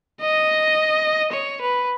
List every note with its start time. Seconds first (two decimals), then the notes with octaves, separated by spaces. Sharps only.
0.21 D#5
1.32 C#5
1.61 B4